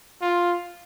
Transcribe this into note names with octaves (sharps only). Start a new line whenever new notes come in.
F4